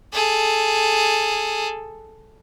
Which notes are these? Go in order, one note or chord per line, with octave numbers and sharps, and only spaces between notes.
G#4 A4